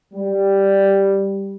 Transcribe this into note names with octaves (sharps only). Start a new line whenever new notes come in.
G3